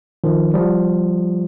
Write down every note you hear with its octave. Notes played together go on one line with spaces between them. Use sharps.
D#3 F3
F3 G3